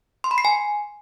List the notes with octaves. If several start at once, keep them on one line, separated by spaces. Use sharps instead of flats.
C6
B5
C7
G#5